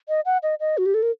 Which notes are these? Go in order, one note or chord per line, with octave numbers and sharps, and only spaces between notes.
D#5
F#5
D#5
D#5
F#4
G4
A4
A#4